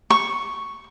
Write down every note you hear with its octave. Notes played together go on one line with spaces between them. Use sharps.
C#6